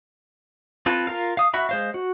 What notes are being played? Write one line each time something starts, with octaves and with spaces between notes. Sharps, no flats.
C4 F4 A4 B4
F4 A#4 F5
F5 D#6
F#4 E5 B5
G#3 C5 F5
F#4